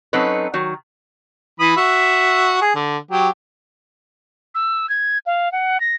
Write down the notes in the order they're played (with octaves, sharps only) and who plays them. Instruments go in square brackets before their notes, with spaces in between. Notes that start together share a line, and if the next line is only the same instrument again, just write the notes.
[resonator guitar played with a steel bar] F#3 C4 C#4 D#4 A4 B4
D#3 F#3
[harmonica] E3 B5 D#6
F#4 E5
G#4
D3
F#3 G4
[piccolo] E6
G#6
F5
F#5
A#6